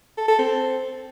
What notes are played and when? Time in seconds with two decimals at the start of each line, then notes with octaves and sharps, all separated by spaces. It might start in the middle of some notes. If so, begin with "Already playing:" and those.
0.18 A4
0.28 A4
0.39 C4